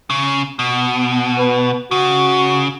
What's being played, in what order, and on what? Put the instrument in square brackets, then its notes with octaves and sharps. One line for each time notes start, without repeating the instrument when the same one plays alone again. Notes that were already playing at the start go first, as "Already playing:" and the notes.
[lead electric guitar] C#3
B2
[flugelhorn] B4
[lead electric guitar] C#3 [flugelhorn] F#4